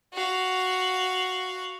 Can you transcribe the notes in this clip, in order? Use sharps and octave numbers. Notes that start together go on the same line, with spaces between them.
F#4 F5